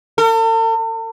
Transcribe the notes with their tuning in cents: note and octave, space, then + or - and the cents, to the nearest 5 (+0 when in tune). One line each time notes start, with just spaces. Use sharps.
A4 +45